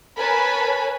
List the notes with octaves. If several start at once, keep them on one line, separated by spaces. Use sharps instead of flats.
A#4 B4 C#5 G#5 A5 B5